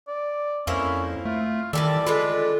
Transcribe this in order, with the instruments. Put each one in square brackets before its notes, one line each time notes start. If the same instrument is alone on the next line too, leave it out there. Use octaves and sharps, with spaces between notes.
[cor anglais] D5
[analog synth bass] F2 [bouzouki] A#3 E4 C5 [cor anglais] C#4
[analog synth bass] A3 [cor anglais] F4
[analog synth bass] D#3 [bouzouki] E3 G3 A4 [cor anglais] D5
[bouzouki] D3 G#3 B4 [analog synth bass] F4